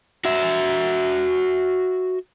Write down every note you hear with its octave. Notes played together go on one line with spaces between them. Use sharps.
F#4 E5